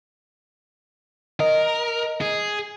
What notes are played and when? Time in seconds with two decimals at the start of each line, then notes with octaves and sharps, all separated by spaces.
1.40 A#4 D#5
2.21 G#4